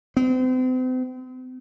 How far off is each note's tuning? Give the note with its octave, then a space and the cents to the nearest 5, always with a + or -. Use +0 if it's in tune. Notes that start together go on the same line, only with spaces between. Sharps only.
C4 -40